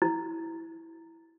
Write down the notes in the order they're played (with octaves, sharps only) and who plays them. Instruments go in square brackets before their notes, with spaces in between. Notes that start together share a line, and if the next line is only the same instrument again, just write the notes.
[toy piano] E4